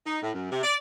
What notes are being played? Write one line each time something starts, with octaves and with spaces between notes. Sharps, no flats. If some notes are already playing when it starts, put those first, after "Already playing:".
D#4
A2
F#2
C3
D5